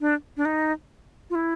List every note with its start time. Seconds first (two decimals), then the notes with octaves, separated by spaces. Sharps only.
0.01 D4
0.37 D4
0.45 D#4
1.30 F4
1.35 E4